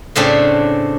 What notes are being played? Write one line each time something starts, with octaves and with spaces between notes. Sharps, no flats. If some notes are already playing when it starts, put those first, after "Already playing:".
A2 C#3 A3 C4 D4 G4